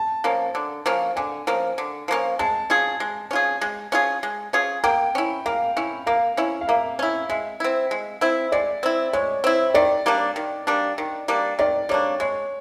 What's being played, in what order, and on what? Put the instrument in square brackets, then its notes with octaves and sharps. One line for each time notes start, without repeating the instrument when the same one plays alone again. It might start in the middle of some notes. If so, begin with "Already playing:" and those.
Already playing: [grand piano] A5
[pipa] F3 A#3 C#4
D3
F3 A#3 C#4
[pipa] D3 [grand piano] G#5
[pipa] F3 A#3 C#4
D3
F3 A#3 C#4
[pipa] G#3 [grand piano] A5
[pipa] C#4 F4 G#4
G#3
C#4 F4 G#4
G#3
C#4 F4 G#4
G#3
C#4 F4 G#4
[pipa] A#3 [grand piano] G5
[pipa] C#4 E4
[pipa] A#3 [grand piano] F5
[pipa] C#4 E4
[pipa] A#3 [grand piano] F5
[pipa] C#4 E4
[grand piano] F5
[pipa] A#3 [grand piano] E5
[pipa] C#4 E4
[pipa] G#3 [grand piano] E5
[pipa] C4 E4
G#3
C4 E4
[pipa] G#3 [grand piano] D5
[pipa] C4 E4
[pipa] G#3 [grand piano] C#5
[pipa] C4 E4
[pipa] D#3 [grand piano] D5
[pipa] G3 A#3 D4
D#3
G3 A#3 D4
D#3
G3 A#3 D4
[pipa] D#3 [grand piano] D5
[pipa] G3 A#3 D4 [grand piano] C#5
[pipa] G#3 [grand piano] C#5